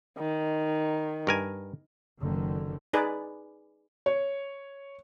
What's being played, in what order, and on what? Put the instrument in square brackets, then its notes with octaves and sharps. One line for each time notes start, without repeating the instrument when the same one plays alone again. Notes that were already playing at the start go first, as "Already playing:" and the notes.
[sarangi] D#3
[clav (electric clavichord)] G2 A#4 G#5
[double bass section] F#1 D3 D#3
[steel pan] D#4 G#4 B4 D5
[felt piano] C#5